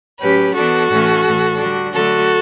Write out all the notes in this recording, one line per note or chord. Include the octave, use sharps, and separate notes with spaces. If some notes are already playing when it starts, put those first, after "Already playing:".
A2 F#3 C#4 G4 B4
E3 B3 D4 F#4 A4
A2 E3 A3 C#4
A2 E3 A3
D3 G3 D4 F#4
D3 F#3 A3 F#4 A4